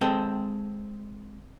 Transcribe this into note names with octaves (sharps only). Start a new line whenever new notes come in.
G#3 C4 A4 G5